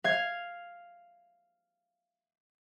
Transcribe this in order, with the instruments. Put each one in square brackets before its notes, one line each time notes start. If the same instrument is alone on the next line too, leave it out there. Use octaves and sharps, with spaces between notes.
[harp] F5 G#6